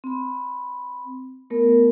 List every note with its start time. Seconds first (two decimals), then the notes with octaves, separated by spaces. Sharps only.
0.04 C4 B5
1.50 A3 B3 A#4